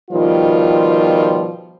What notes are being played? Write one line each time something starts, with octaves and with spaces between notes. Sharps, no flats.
B2 D#3 F3 G3 F4